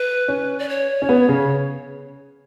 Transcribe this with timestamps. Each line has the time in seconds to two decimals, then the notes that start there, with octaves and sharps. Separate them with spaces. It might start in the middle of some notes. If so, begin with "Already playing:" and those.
Already playing: B4
0.28 C#4
0.59 D5
0.69 C#5
1.02 C#4
1.09 B3
1.29 C#3